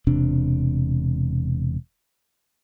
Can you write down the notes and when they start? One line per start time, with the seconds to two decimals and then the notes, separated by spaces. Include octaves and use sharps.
0.07 E1 C3 D4